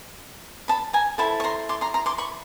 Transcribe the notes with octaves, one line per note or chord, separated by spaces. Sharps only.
A5 B5
G#5 A#5
E4 A4 C5 A5 B5
C#6
A#5 C6
C6 D6
A#5 C6
A#5 C6
C6 D6
B5 C#6